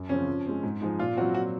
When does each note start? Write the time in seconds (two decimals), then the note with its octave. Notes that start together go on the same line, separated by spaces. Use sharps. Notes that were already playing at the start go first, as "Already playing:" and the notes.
Already playing: F#2
0.09 C#3 F3 C4 C#4
0.28 F3
0.46 G#3 C4
0.63 G#2
0.81 F3 G#3 D#4
0.99 A#2 F4
1.17 C4 F#4
1.20 F#3
1.34 F#4